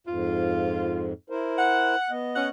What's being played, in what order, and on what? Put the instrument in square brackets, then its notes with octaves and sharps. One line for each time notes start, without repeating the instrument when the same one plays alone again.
[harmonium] F2 G#2 [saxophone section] F4
[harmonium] E4 A#4 C5
[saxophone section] F#5
[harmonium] B3 D#5
[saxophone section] C#4 F#5